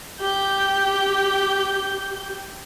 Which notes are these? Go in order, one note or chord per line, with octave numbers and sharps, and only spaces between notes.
G4 G6